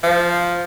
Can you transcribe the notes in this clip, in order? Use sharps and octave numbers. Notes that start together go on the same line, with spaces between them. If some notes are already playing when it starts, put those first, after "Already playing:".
F3